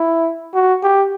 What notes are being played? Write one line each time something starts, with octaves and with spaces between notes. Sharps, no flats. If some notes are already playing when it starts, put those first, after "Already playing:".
Already playing: E4
F#4
G4